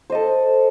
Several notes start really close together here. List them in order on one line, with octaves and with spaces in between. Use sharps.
C5 D#5 A4